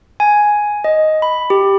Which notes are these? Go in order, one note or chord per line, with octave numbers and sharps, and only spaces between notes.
G#5
D#5
B5
G4